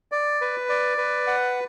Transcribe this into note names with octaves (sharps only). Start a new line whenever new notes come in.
D5
B4
D5
B4
F#5